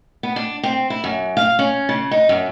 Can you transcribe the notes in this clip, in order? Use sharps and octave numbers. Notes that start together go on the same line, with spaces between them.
B3
D4
C4
E4
F#2
F5
C#4
C#3
D#4
F#2